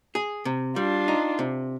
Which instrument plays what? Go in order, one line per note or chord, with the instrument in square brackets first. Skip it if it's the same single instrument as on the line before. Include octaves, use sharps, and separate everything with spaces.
[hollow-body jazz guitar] G#4
C3
[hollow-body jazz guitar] G3 [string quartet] D4 F4
[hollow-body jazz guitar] D#4
C3